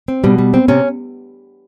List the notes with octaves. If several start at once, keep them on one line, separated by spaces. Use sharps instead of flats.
C4
B2 G3
G3
C4
C3 C#4